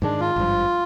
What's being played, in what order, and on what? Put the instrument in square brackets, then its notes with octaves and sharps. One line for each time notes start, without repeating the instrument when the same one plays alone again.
[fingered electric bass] G#2 D#3 G#3 [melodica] D4
[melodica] F4
[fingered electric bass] G#1 G2 F3